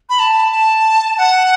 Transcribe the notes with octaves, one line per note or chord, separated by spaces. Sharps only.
B5
A5
A5
F#5